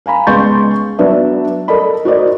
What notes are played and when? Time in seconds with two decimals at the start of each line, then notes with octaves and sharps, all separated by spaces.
0.06 F5 G#5 A#5 B5
0.27 C#2 B3 C6 C#6 G6 A6
0.99 F#3 B3 D4 B4 D5 E5
1.68 A4 A#4 D5 D#5 B5
2.05 F#4 A#4 C5 D5 D#5